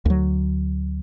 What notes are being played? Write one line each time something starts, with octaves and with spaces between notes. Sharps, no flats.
D2 F#3